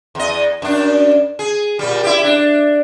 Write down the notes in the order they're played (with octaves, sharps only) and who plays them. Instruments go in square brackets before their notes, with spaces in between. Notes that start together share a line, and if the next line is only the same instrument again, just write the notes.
[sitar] E2 D#5
F#2 D4
G#4
A#2 G3
E4 G4
D4